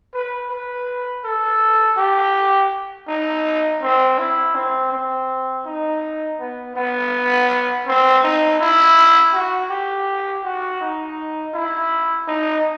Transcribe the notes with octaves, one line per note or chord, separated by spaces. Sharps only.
B4
B4
A4
G4
D#4
C4
E4
C4
C4
D#4
B3
B3
C4
D#4
E4
F#4
G4
F#4
D#4
E4
D#4